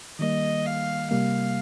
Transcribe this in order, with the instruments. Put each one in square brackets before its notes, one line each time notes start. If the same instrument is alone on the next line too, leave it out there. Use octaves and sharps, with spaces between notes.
[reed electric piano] D#3 G3 A#3 [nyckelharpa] D#5
[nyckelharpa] F5
[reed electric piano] C3 G3 A#3 [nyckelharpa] F5